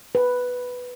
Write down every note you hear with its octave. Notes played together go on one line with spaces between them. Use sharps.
B4